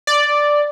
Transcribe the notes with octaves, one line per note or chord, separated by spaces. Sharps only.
D5